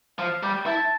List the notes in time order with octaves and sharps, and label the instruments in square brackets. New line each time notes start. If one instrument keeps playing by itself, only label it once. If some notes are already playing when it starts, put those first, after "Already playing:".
[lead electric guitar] F3 [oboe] F5
[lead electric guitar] G3 [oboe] G5
[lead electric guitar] E4 [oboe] A5